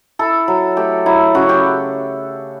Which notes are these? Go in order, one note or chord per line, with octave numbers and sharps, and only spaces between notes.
E4 A4
F#3
A3 G4
F#3 E4
C#3 F#4
G4